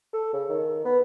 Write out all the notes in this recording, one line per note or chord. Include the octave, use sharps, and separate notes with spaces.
A4
C#3
D#3
B3